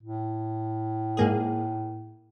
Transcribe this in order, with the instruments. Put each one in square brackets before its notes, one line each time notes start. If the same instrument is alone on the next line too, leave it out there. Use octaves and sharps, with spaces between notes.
[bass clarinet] A2
[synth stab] G#2 A#3 G#4